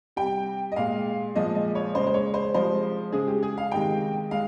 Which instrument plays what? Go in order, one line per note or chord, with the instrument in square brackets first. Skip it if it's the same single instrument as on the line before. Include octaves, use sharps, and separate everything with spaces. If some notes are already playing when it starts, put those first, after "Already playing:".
[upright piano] C3 G3 G5
D#5
A#2 G#3 F5
A#2 F3 G#3 D#5
D#5
C#5
C#3 C5
G#3
C5
C#5
C5
C3 F3 G#3 C5
C#3 G#3 G#4
G4
G#4
F5
C3 D#3 G#3 G5
G#3 F5